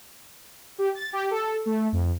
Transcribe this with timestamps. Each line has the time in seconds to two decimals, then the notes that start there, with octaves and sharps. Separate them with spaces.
0.78 G4
0.95 A6
1.13 G4
1.31 A4
1.66 A3
1.92 F2